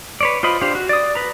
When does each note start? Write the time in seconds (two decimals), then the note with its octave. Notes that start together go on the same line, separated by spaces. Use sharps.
0.21 B4 C#5 D5
0.43 F4 C5 D#5 B5
0.61 D4 G4 C5 F5
0.75 F#4
0.89 D5 D#6
1.15 B4 A#5